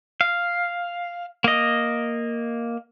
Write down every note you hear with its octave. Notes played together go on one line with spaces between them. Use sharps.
F5
A#3 D#5